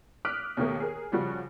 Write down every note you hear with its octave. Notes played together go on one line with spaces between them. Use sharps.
D6 D#6 F6 F#6 B6 D7
D#2 B2 D#3 A3 A#3
G#4 A#4
C#3 F3 G3 F#4